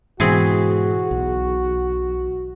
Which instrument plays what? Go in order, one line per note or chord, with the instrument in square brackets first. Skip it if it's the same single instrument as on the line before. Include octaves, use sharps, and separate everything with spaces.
[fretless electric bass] G#2 B2 [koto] E3 C4 G#4 [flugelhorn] F#4
[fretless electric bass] B1